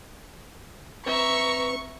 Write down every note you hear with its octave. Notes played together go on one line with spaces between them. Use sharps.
C4 B4 E5 A#5 C#6